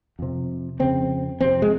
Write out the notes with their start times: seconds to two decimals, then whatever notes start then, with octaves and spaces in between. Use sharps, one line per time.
0.19 F2 C3
0.79 F2 C#3 C4
1.41 F2 C3 C4
1.62 G#3